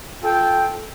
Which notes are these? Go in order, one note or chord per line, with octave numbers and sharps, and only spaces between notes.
F4 A4 G5